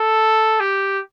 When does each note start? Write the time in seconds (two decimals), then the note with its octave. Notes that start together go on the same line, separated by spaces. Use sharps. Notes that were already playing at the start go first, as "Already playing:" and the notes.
Already playing: A4
0.60 G4